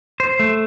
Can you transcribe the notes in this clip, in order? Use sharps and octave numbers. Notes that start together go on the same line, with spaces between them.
C5
A3